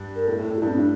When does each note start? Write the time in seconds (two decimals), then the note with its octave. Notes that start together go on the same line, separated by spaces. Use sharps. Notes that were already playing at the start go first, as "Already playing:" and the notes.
Already playing: G2
0.16 A#4
0.27 A2 A4
0.39 A2
0.43 A4
0.50 A2
0.58 G2 E4
0.68 C4
0.73 A2 D4